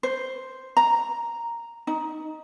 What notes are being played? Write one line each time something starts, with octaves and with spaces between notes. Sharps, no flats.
C5
A#5
D#4